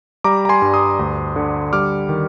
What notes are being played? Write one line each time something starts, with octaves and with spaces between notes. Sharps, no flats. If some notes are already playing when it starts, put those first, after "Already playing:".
G3 A#5 D6
A#5
G#5 C6
G2
C6 D#6
D2
D3
G3 D6 F6
D#3